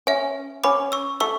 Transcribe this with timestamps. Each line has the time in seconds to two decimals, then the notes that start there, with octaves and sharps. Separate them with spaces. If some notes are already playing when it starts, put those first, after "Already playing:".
0.07 C#4 E5 G#5
0.64 C#4 B5 D6
0.92 C#6 E6
1.20 A3 C#6 E6